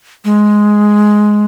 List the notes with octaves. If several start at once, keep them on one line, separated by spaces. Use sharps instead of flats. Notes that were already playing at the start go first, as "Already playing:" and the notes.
G#3